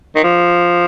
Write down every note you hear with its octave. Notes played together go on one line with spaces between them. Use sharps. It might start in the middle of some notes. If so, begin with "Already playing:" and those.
D#3
F3